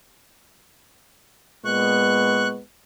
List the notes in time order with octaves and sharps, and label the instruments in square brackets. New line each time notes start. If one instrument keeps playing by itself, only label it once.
[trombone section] A#2 G#3 B3 [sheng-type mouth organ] C#6 F#6